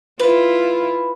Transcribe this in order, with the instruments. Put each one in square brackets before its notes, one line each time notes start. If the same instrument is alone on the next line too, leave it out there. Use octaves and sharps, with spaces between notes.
[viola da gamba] E4 F4 [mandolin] B4